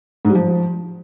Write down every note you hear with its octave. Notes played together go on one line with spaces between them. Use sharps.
G#2
G3
F3